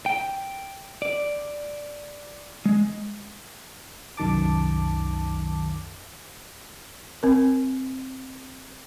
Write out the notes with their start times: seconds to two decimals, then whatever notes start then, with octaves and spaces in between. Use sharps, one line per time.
0.06 G5
1.02 D5
2.66 G#3
4.17 C2 F#2 D#3 A5 D6
7.23 C4 A#4